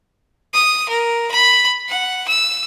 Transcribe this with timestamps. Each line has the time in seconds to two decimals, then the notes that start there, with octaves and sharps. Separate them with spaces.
0.54 D#6
0.88 A#4
1.31 B5
1.88 F#5
2.27 E6